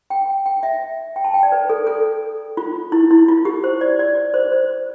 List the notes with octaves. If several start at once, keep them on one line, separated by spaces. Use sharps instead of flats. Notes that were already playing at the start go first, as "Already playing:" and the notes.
G5
G5
E5
G5
A5
G5
D5
B4
A4
A4
F4
E4
E4
F4
G4
C5
D5
D5
C5
C5